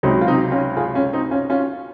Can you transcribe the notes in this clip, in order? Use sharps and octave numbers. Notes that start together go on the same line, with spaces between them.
C#2 C3 F#3 C4 D#4
F4
C4 D#4
C#4 F4
F4 G#4
C#4 F4
C4 D#4
C#4 F4
C#4 F4